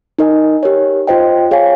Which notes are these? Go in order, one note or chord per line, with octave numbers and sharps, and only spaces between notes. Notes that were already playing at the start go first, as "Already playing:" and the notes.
D#4 A#4 D#5 G#5
G4 A#4 C#5
F4 C5 D#5 G5
G#4 C#5 F5 G#5